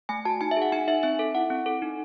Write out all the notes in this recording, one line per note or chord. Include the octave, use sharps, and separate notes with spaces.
A3 G#5
F#4 A5
D#4 G#5
E5
G#4 F#5
D#4 G#5
D#4 E5
C4 E5
A4
E4 F#5
C4
A4
D#4